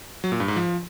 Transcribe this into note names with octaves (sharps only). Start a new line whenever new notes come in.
F#3
A#2
G2
G#2
F3